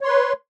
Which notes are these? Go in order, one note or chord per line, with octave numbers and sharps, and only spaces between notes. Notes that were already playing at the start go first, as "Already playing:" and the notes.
B4 C#5 C6